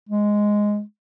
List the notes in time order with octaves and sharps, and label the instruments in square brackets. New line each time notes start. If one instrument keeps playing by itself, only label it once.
[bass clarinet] G#3